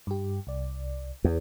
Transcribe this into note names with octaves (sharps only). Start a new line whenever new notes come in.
G2 G4
C2 D5
E2